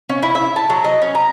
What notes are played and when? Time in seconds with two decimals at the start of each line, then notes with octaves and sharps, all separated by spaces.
0.09 C#4
0.23 E4
0.35 E5
0.56 A5
0.70 F#3
0.84 D#5
1.02 C#4
1.15 A#5